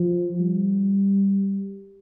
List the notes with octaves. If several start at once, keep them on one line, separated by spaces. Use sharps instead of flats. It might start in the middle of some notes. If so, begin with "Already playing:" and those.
Already playing: F3
G3